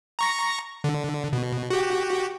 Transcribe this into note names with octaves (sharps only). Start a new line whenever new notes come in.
A#5 C#6 A#6
D3
B2
F#4 G4